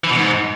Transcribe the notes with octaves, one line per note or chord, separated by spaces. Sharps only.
E3
B2
G#2